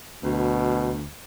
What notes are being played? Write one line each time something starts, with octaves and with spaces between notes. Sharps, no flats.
D2 B2